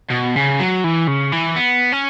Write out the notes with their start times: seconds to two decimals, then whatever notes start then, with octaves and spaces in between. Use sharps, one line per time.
0.11 B2
0.36 C#3
0.60 F#3
0.84 E3
1.08 C#3
1.32 E3
1.56 B3
1.92 C#4